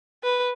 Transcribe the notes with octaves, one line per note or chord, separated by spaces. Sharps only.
B4